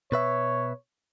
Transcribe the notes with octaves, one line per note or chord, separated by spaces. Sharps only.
B2 B4 C#5 E5